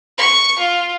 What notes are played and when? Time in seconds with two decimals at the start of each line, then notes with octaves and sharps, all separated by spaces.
0.18 C#6
0.58 F4